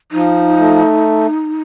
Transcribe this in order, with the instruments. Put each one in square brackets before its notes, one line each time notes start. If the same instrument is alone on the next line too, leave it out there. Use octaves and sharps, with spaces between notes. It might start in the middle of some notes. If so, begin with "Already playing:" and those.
[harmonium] F3 [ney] D#4
[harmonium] A3